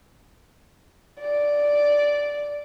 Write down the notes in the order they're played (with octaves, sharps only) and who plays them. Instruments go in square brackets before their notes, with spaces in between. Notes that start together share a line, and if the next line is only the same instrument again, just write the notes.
[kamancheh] D5